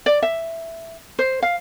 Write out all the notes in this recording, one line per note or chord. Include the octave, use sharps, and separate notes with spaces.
D5
E5
C5
F5